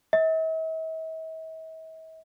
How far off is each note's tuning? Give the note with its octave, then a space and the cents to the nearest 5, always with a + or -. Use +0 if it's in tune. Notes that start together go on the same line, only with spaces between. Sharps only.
E5 -45